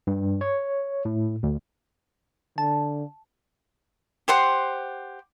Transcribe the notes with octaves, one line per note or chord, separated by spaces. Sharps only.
G2
C#5
A2
D2
D3 A5
G4 C5 F#5 C6